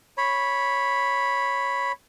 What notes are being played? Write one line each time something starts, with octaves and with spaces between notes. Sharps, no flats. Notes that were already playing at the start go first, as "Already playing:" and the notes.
C#5 B5